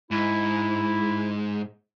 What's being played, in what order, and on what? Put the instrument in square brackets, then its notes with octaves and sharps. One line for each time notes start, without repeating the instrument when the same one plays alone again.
[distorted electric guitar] G#2 [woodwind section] E4